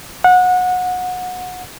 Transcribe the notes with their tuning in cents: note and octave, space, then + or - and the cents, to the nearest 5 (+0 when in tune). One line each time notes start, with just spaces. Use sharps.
F#5 -25